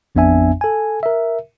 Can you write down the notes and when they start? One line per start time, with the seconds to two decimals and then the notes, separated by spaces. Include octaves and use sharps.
0.15 A1 F2 B3 D4 E5 G#5
0.61 A4 G#5
1.03 A#4 E5